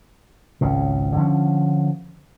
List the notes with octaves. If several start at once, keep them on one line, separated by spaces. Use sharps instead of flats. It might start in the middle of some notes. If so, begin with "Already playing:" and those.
G#1 C#2 C#3
D3 F3 C4 C#4